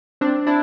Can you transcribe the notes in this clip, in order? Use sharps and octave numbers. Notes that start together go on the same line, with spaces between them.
C4 D4
D4 E4